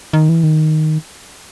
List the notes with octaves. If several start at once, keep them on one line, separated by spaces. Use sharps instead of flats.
D#3
E3
D#3